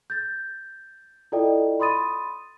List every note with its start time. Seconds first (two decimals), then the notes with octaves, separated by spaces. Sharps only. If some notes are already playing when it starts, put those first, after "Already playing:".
0.10 G6 A6
1.32 E4 F4 A4 D5 D#5 G5
1.80 B5 C6 D#6 A6 D#7